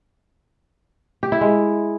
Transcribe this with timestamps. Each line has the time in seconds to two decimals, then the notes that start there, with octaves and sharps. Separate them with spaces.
1.23 G4
1.32 E4
1.41 G#3